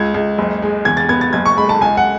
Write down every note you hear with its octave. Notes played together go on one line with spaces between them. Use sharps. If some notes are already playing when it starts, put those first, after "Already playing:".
Already playing: C#2 G#6
C#2
F#1
G#3
E2 G#6
A6
B3 G#6
A6
F#1 G#6
C#6
G#3 B5
A5
C#2 G#5
F#5